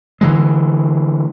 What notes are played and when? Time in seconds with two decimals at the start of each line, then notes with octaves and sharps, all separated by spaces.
0.21 D3 E3 G#3